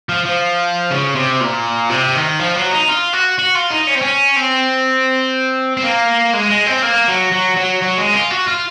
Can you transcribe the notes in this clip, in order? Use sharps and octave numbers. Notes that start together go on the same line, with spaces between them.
F3
F3
C#3
C3
A#2
C3
D#3
F3
F#3
D#4
F4
F#4
F#4
F4
D#4
C#4
C4
C#4
C4
C4
A#3
G#3
G#3
C4
A#3
F#3
F#3
F#3
F#3
G#3
F4
F#4
F4